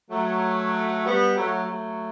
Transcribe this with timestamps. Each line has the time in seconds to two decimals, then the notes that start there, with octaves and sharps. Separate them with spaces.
0.10 F#3 A3
1.04 G3 B3
1.36 F#3 A3
1.68 F#3 A3